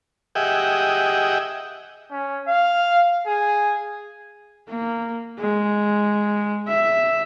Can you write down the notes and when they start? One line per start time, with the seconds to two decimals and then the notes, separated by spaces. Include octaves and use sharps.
0.35 G4 G#4 D#5 E5 F#5 G5
2.11 C#4
2.48 F5
3.27 G#4
4.70 A#3
5.39 G#3
6.68 E5